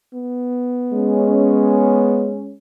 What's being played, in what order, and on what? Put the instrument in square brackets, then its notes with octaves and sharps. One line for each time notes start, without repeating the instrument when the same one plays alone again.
[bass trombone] B3
[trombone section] G#3 C#4